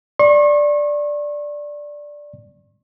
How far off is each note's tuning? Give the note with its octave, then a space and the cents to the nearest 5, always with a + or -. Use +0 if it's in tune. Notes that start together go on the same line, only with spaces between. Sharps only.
D5 +0 C#6 -40